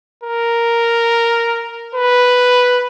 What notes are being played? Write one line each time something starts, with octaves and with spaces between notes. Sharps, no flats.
A#4
B4